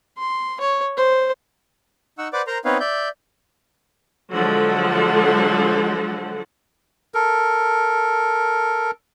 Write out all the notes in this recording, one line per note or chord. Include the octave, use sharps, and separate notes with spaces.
C6
C#5
C5
D#4 F#5 C#6 E6
B4 C5 D5 F#5 D6
A#4 C5 A#5 C6
B3 C4 D#4 B4 C#5 F5
D5 E5 G6
D3 F3 F#3 G#3 A4 F#5
A4 A#4